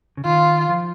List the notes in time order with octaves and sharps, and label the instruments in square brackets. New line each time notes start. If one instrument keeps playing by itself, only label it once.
[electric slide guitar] C#3
[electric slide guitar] D#3 [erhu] F4
[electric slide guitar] F3